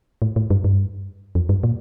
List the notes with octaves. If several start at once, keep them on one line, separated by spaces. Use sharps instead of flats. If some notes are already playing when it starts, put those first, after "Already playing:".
A2
A2
G2
G2
F2
G2
A#2